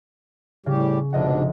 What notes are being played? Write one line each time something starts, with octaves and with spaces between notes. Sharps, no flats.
A2 C#3 G3 G4
F1 G#2 B2 D4 D#5 F#5